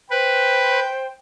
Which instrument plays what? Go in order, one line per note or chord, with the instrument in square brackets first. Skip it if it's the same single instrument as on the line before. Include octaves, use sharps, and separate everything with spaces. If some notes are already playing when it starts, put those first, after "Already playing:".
[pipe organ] B4 [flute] C5 [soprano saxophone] G5